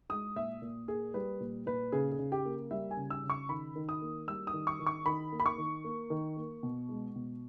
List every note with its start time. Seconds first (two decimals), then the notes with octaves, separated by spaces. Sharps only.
0.09 G#3 D#6
0.35 A#2 E5
0.62 A#2
0.88 A#3 G#4
1.14 G3 B4
1.40 A#2
1.66 A#2 B4
1.92 C#3 G#4
2.12 G#4
2.19 C#3
2.32 G4
2.45 A#3
2.71 G3 E5
2.91 G#5
2.97 C#3
3.10 E6
3.24 C#3
3.30 C#6
3.49 D#3 B5
3.76 D#3
3.89 D#6
4.02 A#3
4.28 G3 E6
4.47 D#6
4.54 D#3
4.67 C#6
4.80 D#3
4.87 C#6
5.06 D#3 B5
5.32 A#3
5.40 B5
5.46 C#6
5.58 D#3
5.85 A#3
6.10 D#3
6.37 A#3
6.63 B2
6.89 G#3
7.16 B2